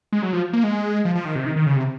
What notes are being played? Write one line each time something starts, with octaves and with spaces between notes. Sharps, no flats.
G#3
F#3
F3
A#3
G#3
F3
F3
D#3
C3
D#3
D#3
C#3
C3